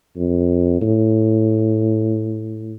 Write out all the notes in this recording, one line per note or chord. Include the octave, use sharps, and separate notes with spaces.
F2
A2